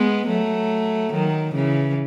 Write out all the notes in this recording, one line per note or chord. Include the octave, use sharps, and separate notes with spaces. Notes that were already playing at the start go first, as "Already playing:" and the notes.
Already playing: G#3 B3
F#3 A3
D#3 F#3
C#3 E3